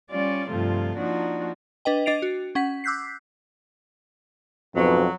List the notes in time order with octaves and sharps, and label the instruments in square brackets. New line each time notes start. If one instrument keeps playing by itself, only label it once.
[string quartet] G3 C#4 F4 D5
G2 C3 F3 A3 F4
F3 A#3 D4 D#4 F#4
[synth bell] D4 B4 D#5 G5
D4 D#5 A6 C7 D7 F7
F#4
C#4 F#5 B6
D6 E6 F#6 G6 B6 C7
[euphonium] F2 [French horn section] G#2 B2 [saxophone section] F#3